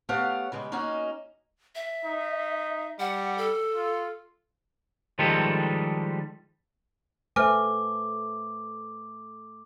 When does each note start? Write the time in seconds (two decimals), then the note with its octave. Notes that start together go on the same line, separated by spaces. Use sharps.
0.09 A3 B3 G4 C#5 F5 F#5
0.52 C#3 G3 G#3
0.72 A#3 C#4 D#4 F#4 G#5
1.75 E5
2.05 D#4
2.99 G3 F#5
3.38 A4
3.75 F4
5.19 D#3 F3 G3 G#3 G4 A4
7.36 A3 A4 B4 C5 E5 G#5 D6 F6